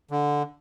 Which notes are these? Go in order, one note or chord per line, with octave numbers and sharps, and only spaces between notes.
D3